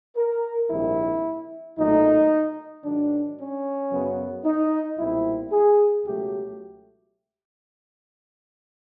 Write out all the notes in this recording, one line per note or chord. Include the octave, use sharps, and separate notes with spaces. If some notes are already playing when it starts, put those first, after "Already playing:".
A#4
A#1 G#2 D#3 G3 C4 E4
B1 A#2 F#3 A3 D#4
G#2 D#3 F#3 D4
C#4
F#2 C#3 F#3 B3
D#4
B1 A#2 G3 C4 E4
G#4
C#2 B2 F#3 A3 G4